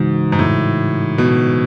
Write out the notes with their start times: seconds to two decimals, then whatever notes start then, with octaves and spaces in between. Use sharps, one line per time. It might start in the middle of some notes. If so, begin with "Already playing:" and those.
Already playing: G#2 C#3 E3 G#3 D#4 F#4
0.32 G#2
0.39 A2
1.18 B2